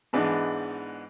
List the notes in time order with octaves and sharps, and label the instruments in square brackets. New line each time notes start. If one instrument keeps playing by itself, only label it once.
[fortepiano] G#2 E3 G#3 B3 D4 D#4